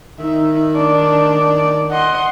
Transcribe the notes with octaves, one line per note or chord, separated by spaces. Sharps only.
D#3 D#4 E5
D4 D5
D#5 F#5 C6